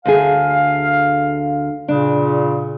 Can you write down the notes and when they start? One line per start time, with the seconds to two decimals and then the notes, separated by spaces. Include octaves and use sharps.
0.05 D2 D3 G#4 F5
1.88 A#2 C#3 D4